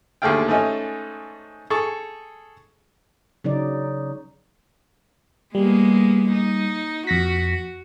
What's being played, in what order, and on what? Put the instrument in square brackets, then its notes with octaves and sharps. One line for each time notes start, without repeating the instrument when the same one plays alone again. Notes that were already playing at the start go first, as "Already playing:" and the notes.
[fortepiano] D#2 D3 A3 G#4 F5 G5
G#2 A3 C#4 D#4
G#4 A4 C#6
[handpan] C#3 F#3 D#4 D5
[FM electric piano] G3 [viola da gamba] G#3 A#3 B3
[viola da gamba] D#4
[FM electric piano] F2 A#6 B6 [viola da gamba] F#4